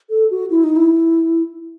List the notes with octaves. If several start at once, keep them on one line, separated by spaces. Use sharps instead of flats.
A4
F#4
E4
D#4
E4